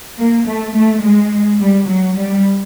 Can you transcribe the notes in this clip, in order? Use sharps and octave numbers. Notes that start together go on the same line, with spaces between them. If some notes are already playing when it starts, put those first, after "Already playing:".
A#3
A3
A3
G#3
G3
F#3
G3